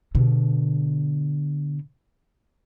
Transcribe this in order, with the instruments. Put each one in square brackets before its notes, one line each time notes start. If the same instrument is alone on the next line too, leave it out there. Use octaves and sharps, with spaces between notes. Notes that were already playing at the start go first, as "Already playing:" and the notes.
[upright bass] B2 D3